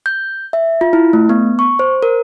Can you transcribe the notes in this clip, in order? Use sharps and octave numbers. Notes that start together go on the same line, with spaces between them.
G6
E5
F4
E4
A3
B3
C#6
C5
A#4